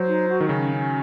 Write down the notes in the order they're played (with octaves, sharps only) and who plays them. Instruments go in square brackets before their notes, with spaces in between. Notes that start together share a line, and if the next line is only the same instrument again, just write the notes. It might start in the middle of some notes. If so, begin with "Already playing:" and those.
Already playing: [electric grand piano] F#3 [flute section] C5
[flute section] D#4
F#4
[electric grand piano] D#3
[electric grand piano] C#3 [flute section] C#4
[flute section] C#4